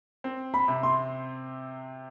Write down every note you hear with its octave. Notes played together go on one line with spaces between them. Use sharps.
C4
B5
C3
C6